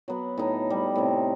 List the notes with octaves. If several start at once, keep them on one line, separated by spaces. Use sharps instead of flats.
F#3 B3
A2 D#4
G3
A2 C3